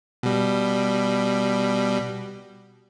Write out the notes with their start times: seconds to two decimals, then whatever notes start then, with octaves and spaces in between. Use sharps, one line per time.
0.23 B2 G3